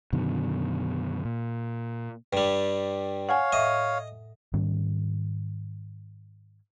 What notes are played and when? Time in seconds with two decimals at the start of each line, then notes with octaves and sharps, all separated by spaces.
0.13 F#2 B2 D3 D#3
1.25 A#2
2.33 G2 G3
3.29 C#5 F5 F#5 G#5
3.52 A2 D#5 E5
4.54 G#2 D#3 G3 C#4